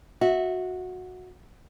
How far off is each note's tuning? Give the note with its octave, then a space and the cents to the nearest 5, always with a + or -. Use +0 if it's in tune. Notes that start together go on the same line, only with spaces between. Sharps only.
F#4 -15 E5 -20